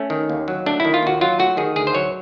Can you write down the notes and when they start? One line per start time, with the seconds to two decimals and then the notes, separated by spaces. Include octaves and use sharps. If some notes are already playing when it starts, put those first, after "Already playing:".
Already playing: A3 C#4
0.10 D#3
0.30 D#2
0.48 F#3
0.66 A3 D4
0.80 D#3 E4
0.94 F4
1.03 D#2 F#4
1.21 F#3 F4
1.39 A3 F#4
1.57 D#3 G#4
1.76 D2 G#4
1.87 C5
1.95 F#3 C#5